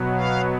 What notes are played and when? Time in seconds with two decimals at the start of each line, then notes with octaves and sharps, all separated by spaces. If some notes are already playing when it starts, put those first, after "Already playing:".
Already playing: B2 F#3 B3
0.14 F5